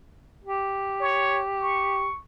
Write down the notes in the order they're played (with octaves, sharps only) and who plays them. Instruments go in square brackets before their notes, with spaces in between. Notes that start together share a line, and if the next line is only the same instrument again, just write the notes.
[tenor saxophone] G4
[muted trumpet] C#5
C#6